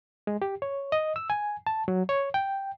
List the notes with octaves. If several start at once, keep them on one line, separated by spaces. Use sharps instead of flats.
G#3
G4
C#5
D#5
E6
G#5
A5
F#3
C#5
G5